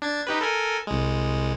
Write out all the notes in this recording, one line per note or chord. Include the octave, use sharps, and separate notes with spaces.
D4 G#6 A6
D#4 G4 B4
A4 A#4 G#5
C2 G#3